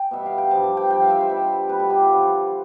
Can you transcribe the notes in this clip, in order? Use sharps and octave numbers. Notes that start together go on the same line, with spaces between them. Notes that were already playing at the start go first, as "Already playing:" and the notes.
Already playing: G5
B2 G3 E5
F5
G5
G2 F3 A5
A5
G5
G2 F3 G5
F5
E5
C5
B2 G3
B2 G3 B4
A4
G4
F4
G2 D3 F3